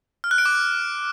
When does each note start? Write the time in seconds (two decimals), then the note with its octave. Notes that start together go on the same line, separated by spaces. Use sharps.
0.24 F6
0.31 F#6
0.38 D7
0.45 D6